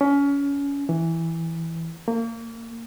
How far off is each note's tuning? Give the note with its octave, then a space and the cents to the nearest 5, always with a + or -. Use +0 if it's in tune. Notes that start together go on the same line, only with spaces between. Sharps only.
C#4 +25
E3 -5
A#3 -30